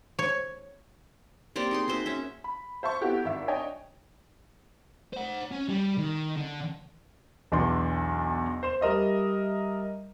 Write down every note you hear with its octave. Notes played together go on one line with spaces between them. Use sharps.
C#5
A#3 C4 G4 D5
D#4 G#4 C6
D#4 F#4 C5 E5
C#4 E5
B5
C5 E5 A5 C#6
B3 E4 F#4 G4 A4
G#1 E5
D4 C#5 D#5 G5 G#5
C5 F#5
C#4
G3 G4
D#3
D3
B1 E2 D4 D5 C6
C5 C6 E7
G3 A#4 D#5 E5